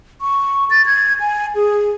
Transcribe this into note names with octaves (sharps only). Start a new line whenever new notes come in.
C#6
A6
G#6
G#5
G#4